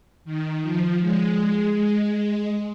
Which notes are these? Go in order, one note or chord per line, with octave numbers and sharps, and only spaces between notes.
D#3
F3
G#3
G#3
G#3